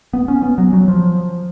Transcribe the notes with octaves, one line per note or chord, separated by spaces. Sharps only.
B3
C#4
B3
F#3
F#3
F3